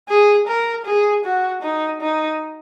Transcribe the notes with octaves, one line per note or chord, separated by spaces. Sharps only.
G#4
A#4
G#4
F#4
D#4
D#4